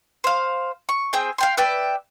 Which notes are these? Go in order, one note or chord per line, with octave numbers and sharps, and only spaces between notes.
C5 F5
C#6
C4 G#4 G5
F5 G5 C6
B4 D5 E5 G5